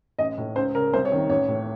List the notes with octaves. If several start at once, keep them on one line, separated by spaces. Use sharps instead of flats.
A1 D#5
A2
C#2 C5
C#3 A#4
C2 C5
C#5
C3 D#3
A1 C#5
A2